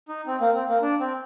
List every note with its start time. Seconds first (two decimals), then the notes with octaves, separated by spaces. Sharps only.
0.09 D#4
0.27 C4
0.41 A#3
0.54 C4
0.68 A#3
0.82 D4
1.00 C4